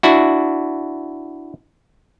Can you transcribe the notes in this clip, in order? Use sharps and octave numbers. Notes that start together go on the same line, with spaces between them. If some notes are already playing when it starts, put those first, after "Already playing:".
D4 E4 F#4